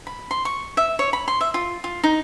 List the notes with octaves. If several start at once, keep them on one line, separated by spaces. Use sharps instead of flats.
B5
C6
C#6
E5
C#5
B5
C6
E5
F4
F4
D#4